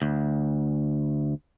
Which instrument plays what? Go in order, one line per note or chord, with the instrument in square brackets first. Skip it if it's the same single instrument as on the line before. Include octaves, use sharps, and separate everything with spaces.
[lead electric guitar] D2